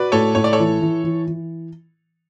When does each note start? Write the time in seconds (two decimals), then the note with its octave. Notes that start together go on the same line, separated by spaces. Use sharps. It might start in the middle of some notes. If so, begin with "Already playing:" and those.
Already playing: F#4 B4 D5
0.12 A2 A4 C#5
0.35 A2 C#5
0.44 D5
0.53 A4 C#5
0.59 E3
0.82 E3
1.04 E3
1.27 E3